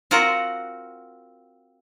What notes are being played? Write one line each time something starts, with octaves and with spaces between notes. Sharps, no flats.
C4 F4 F#4 A#4 F#5